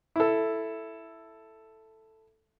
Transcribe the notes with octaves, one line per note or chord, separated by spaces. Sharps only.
E4 A4